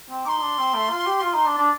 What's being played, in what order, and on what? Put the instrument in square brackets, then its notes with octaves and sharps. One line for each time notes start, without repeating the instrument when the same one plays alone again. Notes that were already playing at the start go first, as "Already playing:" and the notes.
[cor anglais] C4
[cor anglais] D#4 [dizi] C6 D6
[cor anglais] D#4
D4
C4
A3
F4
G4
F4
D#4
D4
D4